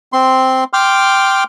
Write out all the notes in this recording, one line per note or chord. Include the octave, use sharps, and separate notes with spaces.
C4 C6
G5 C6 D6 F6